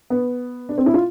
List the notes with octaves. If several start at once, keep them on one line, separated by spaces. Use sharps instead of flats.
B3
D4
C4
E4
F4